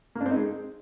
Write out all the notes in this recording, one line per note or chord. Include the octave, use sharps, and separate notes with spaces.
A#3
D4
C4
D#4
G#3